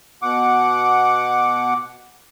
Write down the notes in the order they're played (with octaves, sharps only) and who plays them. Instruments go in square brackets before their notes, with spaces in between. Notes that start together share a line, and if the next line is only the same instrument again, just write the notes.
[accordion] B2 F#5 D6